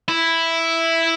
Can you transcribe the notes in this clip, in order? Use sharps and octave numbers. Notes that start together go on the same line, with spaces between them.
E4